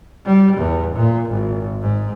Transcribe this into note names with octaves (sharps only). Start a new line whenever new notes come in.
G3
E2
A#2
G#1
G#2